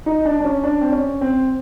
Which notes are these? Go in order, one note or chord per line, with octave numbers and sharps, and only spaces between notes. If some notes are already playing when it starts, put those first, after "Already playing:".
D#4
D4
D4
C#4
D4
C4
C#4
C4